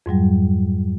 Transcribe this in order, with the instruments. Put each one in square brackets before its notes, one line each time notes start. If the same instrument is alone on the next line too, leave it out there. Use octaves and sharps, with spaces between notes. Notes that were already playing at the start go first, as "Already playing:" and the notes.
[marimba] F2 G#2 F#3 G3